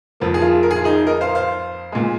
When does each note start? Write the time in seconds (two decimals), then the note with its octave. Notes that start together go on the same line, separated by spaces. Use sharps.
0.20 F2 F3 A#3
0.34 G#4
0.42 F4
0.63 A#4
0.71 G#4
0.77 F4
0.84 D#4 G#4
1.07 A#4 D#5
1.21 C5 F5
1.35 C5 F5
1.92 A#2 G#3